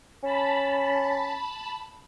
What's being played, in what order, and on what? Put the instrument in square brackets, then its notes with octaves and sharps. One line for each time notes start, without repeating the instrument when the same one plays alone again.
[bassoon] C#4 [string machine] A5 B5